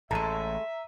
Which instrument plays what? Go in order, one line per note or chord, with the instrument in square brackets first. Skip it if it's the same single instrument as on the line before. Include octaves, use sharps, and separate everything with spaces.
[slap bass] A1 A2 [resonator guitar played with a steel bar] G#3 A3 [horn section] E5 [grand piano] A#5 D#7